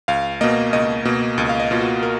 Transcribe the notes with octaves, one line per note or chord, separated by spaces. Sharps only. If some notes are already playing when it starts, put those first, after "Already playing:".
C#2 F5
B2 A#3 D#5
C#2 D#5
B2 A#3
C#2
F5
D#5
B2 A#3 F4
F#4
A#4